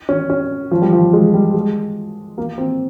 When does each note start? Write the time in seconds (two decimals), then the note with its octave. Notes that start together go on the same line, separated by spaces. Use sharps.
0.09 C#4
0.30 C#4
0.71 F3
0.82 G3
0.93 F3
1.13 G#3
1.34 G3
1.54 G#3
2.38 A#3
2.58 C4